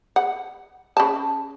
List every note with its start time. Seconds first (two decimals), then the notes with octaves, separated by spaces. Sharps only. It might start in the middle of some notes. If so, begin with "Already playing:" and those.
0.16 F#5
0.97 C#3 A5